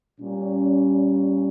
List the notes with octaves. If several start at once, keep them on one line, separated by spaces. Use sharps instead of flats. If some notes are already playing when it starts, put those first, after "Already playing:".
A#2 G3 C#4